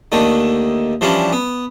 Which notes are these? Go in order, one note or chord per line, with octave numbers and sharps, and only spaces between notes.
D#2 D3 D#3 A3
E3 F3 G3 C#4 D4
B3